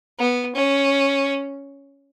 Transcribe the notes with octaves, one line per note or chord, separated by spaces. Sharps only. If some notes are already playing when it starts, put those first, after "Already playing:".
B3
C#4